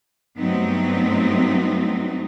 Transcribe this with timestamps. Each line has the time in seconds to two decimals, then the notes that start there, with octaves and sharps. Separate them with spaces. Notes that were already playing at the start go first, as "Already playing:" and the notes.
0.38 G2 F#3 A3 B3 C4 D#4